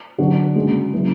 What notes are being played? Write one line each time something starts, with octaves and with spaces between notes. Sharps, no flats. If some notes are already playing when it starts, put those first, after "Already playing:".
D3 F#3 B3 D4 F#4
C#3 G#3 D4 F#4
C#3 F#3 B3 E4